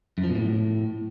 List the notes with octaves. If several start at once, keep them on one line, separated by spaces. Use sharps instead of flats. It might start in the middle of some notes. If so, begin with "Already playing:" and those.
F#2
F3
B2
A2